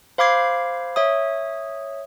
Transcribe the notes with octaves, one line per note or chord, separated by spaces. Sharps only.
C5 F5 B5 D6 G#6 C7
C#5 E5 D#6